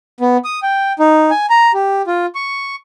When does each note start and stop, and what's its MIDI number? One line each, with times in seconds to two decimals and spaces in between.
0.21 0.37 59
0.45 0.60 87
0.63 0.93 79
0.99 1.31 63
1.31 1.46 80
1.50 1.72 82
1.74 2.02 67
2.07 2.26 65
2.35 2.76 85